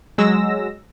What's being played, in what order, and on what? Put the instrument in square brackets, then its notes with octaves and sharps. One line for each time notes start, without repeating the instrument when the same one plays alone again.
[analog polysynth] F#3 G#3 E6 A#6